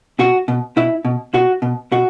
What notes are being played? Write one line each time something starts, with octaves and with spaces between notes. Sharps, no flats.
B2 F#4
B2
B2 E4
B2
B2 F#4
B2
B2 F#4